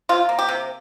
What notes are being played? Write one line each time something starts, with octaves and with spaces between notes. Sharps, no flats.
C3 F4
A#3
G4
C3